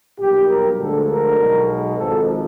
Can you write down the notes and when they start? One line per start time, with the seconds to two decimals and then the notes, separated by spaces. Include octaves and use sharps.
0.19 B1 A#2 G3 G4
0.48 A#4
0.78 D2 D3 F3 G#3 A4
1.08 A#4
1.37 B1 B2 G#3
1.97 G#1 G#2 F3 A4